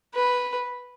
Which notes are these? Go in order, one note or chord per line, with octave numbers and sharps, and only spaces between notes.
B4